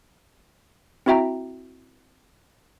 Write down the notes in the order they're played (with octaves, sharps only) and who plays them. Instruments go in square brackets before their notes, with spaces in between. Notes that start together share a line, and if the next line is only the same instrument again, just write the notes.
[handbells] C4 E4 F#4 E5 G5 A#5